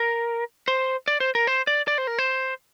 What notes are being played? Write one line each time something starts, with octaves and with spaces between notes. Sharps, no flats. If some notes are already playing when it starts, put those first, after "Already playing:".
Already playing: A#4
C5
D5
C5
A#4
C5
D5
D5
C5
A#4
C5